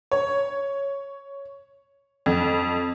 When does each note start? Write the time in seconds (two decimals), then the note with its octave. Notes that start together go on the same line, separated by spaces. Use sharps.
0.12 C#5
2.26 F2